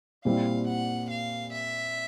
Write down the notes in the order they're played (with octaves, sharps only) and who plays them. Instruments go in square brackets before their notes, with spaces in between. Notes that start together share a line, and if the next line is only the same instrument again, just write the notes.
[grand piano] A#2 G3 C4 E4 [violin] F5
[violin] F#5
F5
E5